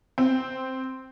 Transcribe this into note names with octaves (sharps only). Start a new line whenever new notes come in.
C4